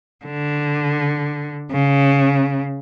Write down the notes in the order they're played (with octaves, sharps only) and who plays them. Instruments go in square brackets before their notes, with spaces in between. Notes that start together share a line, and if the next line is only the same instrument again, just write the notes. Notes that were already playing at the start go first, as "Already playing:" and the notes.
[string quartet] D3
C#3